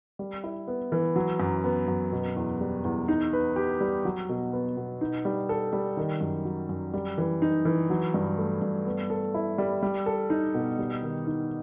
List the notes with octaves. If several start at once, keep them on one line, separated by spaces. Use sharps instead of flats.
G3
E4
B3
E3
F#3
F#2
B3
F#2
B2
E2
G3
E2
D#4
B4
G4
G3
F#3
B2
B3
B2
D#4
G3
A4
G3
D#3
F#2
F#3
F#2
G3
E3
D#4
E3
F#3
G2
A3
G2
B3
A4
E4
G3
G3
A4
D#4
B2
G3
D#3
D#4